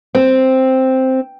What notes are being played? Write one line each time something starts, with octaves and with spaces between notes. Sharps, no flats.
C4